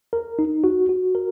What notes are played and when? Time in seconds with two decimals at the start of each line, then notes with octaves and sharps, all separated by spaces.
0.13 A#4
0.39 D#4
0.64 F#4
0.89 F#4
1.15 A#4